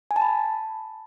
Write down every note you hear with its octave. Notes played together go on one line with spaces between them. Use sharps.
G#5
A5
B5